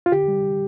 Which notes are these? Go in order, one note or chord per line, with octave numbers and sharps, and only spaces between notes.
F4
D3 G4
G3